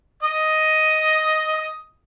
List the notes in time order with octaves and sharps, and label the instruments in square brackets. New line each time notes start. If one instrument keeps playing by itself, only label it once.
[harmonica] D#5 D#6